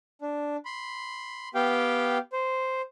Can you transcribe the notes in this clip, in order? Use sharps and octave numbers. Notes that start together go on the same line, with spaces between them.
D4
B5 C6
B3 G4 F5 G5
C5